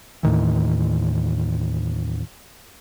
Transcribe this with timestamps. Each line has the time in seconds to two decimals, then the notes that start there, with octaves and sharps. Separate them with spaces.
0.23 D#2 A2 D#3 E3